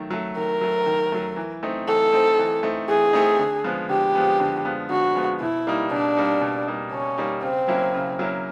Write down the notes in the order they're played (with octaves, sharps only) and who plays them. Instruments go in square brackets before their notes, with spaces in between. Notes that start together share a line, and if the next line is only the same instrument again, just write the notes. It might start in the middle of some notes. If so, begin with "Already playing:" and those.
Already playing: [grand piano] D#3 F#3 A3
F#3 A3
[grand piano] D#3 [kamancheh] A#4
[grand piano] F#3 A3
D#3
F#3 A3
E3
A3 C4 D#4
[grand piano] E3 [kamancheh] A4
[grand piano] A3 C4 D#4
E3
A3 C4 D#4
[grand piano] E3 [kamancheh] G#4
[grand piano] A3 C4 D#4
D3
F3 G#3 B3
[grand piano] D3 [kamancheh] G4
[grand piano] F3 G#3 B3
D3
F3 G#3 B3
[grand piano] D3 [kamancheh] F#4
[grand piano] F3 G#3 B3
[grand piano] B2 [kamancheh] E4
[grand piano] G3 A#3 D#4
[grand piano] B2 [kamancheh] D4
[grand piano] G3 A#3 D#4
B2
G3 A#3 D#4
[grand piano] B2 [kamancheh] C#4
[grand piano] G3 A#3 D#4
[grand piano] C#3 [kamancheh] C4
[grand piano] F#3 A#3 C#4 E4
C#3
F#3 A#3 C#4 E4